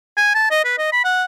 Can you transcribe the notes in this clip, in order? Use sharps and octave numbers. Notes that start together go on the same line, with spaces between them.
G#5
A5
D#5
B4
D#5
B5
F#5